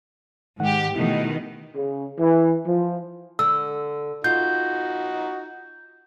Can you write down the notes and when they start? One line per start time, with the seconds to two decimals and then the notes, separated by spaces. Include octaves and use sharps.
0.60 G#2 D#3 G4 F#5
0.95 B2 D#3 A3 E4
1.75 C#3
2.19 E3
2.65 F3
3.39 D3 E6
4.24 D#4 F4 F#4 G6